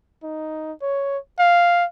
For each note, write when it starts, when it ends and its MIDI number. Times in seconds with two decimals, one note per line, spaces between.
0.23 0.72 63
0.82 1.18 73
1.39 1.85 77